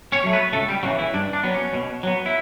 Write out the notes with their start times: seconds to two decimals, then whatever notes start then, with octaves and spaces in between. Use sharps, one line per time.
0.12 C#4 C#5
0.23 F#3 A3
0.33 B3 B4
0.53 C#2 A3 A4
0.68 G3 G4
0.83 C#3 F#3 F#4
0.88 E3
0.99 E3 E4
1.14 G2 D4
1.33 D4
1.43 F#3 B3
1.54 C#4
1.74 B2
2.03 F#3 B3
2.26 E4